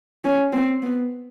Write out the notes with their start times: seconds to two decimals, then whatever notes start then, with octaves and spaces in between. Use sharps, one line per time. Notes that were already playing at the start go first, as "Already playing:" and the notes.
0.24 C#4
0.53 C4
0.82 B3